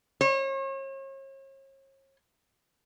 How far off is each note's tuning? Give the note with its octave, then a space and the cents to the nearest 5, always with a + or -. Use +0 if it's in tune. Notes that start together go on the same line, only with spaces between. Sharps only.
C#5 -40